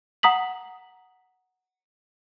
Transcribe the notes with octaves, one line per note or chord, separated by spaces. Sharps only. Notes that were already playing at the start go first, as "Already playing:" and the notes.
F#5 A#5 D#6 B6 F#7